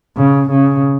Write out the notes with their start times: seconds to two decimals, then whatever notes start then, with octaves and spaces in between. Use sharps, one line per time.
0.17 C#3
0.50 C#3